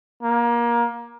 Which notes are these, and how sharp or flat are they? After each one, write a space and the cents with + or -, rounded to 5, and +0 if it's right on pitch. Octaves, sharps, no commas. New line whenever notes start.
A#3 +25